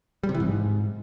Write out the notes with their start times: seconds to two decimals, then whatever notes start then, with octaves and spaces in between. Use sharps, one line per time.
0.23 G3
0.29 C3
0.34 E3
0.40 G#2